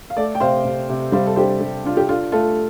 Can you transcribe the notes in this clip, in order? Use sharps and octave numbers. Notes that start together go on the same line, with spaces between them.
F5
A3 A4 D5
G5
C3 C5 F5
C3
C3
G3 C5 F5
A4
D4 G4 C5
G3
D4 F4
G4
D4 F4 A4
A3 F4 A4